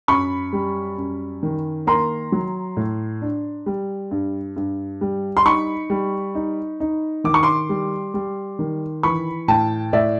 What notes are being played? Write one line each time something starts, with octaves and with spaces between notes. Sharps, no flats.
F#2 B5 C#6
G3
F#2
D#3
A#3 A#5 C6
F#3
A2
D4
G3
G2
G2
G3
C6
D#4 B5 C#6
G3
D#4
D#4
D#3 D6
C#6
C6 D6
G3
G3
D#3
E3 B5 C#6
A2 G5 A5
A2 D5 E5